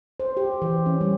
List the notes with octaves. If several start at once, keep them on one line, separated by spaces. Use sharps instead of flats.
C5
G4
E3
C#4
G3